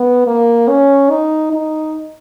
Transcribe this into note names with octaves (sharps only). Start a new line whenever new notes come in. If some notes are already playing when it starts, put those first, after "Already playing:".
Already playing: B3
A#3
C#4
D#4
D#4